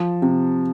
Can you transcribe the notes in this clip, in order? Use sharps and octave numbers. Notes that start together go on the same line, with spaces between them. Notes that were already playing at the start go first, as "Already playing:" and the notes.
Already playing: F3
C3